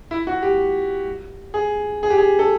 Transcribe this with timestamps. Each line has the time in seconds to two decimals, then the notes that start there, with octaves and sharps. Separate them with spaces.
0.11 E4
0.27 F#4
0.42 G4
1.54 G#4
2.03 G#4
2.10 G4
2.18 G#4
2.39 A4